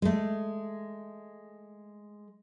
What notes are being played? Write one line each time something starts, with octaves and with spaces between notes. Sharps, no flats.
G#3 A3